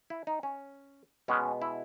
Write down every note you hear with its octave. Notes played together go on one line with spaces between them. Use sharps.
E4
D#4
C#4
B2 G#3 B3 C#4
E4